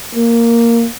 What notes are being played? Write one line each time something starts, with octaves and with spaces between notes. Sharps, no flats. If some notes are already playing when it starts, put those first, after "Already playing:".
A#3